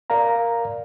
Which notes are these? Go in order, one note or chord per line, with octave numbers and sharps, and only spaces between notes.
A#4 D5 F5 A#5